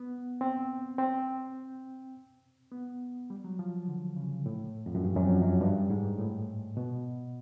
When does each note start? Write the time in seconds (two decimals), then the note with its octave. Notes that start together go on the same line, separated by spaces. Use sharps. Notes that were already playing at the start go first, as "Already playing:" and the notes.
Already playing: B3
0.41 C4
0.98 C4
2.72 B3
3.30 G3
3.44 F#3
3.59 F3
3.88 D3
4.16 C#3
4.46 A2
4.86 F2
4.95 F#2
5.04 G2
5.17 F#2
5.23 F2
5.42 F#2
5.61 G2
5.90 G#2
6.19 A2
6.77 B2